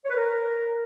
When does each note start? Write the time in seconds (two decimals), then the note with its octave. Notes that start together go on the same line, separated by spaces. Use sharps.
0.04 C#5
0.10 B4
0.16 A#4